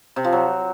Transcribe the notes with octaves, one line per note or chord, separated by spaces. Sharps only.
C3
F3
F#3